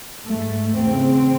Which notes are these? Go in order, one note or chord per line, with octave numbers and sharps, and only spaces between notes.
G#2 A3
E2 C#3 C4